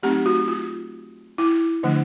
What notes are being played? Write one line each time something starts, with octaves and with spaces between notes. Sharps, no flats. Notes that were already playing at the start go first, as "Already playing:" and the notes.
F#3 A3 C4 D#4 G4
F#4
F4
E4
D3 F3 A3 D4